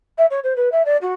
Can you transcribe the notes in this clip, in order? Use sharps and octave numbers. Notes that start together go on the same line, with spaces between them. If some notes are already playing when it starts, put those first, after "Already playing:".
E5
C#5
C5
B4
E5
D5
F#4